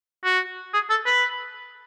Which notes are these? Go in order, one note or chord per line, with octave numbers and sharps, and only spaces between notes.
F#4
G#4
A4
B4